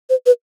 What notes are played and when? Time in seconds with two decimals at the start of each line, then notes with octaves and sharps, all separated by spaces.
0.09 C5
0.26 B4